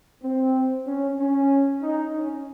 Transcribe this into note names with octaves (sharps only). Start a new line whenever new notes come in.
C4
C#4
C#4
D#4
C#4